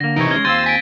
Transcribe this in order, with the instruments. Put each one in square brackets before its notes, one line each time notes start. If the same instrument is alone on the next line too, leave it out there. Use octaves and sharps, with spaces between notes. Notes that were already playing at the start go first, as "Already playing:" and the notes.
[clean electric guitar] D3 A#3 [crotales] A#6
[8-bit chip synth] C3 E3 D#4 [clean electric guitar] A#4 C#5 [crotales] A#6
[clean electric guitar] G#3 C#4 [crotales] G#6 G7
[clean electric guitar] D#2 C4 F4 [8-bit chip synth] C6 E6 [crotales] G6 A6 D#7
[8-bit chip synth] G#5 [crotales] B6 D7